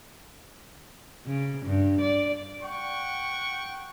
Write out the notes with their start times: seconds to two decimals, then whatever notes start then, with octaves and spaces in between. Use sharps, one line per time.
1.26 C#3
1.65 G2
2.01 D5
2.63 F#5 G5 C#6